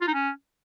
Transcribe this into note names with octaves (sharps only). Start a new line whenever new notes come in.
F4
D#4
C#4